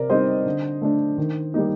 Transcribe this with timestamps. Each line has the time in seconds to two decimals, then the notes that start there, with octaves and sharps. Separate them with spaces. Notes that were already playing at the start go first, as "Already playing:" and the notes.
Already playing: C3 A#4 D5
0.10 G3 C4 D#4 C5 D#5
0.46 D3
0.82 A3 D4
1.18 D#3
1.54 G3 A#3 D#4